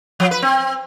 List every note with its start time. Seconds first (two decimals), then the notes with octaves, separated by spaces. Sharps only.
0.20 F3
0.31 B4
0.42 C4